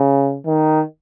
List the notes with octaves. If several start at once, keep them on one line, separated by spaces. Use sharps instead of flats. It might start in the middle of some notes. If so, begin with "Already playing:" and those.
Already playing: C#3
D#3